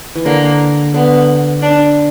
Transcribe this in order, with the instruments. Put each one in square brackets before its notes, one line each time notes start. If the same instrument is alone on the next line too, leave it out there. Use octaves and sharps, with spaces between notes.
[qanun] E3
[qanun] D3 [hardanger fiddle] A#3
[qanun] D3 [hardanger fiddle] B3
[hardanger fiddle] D4